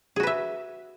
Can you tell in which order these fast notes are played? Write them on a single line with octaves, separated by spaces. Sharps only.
G#4 F#4 B4 E5